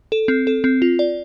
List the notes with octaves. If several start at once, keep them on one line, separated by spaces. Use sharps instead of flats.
A4
C4
A4
C4
F4
D5